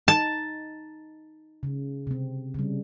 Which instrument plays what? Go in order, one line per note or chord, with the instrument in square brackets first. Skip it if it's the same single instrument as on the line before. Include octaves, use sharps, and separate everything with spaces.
[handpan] D#4 [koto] A5
[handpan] C#3
C3 C4
C#3 G3